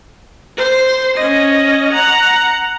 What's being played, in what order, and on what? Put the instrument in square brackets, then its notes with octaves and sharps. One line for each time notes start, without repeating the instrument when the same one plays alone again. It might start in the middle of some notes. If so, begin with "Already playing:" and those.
[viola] C5 C6
C#4 D#5
F#5 A#5